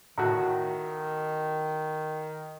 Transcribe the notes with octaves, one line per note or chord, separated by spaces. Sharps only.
A2 D#3 F#4